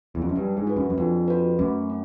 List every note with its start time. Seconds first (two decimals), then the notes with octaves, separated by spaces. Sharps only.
0.15 E2
0.22 F2
0.29 F#2
0.36 G2 D4
0.57 G#2
0.67 F#4 B4
0.76 F#2
0.90 F#2
0.98 F2 D4
1.28 F#4 B4
1.59 F#2 A3
1.90 C#4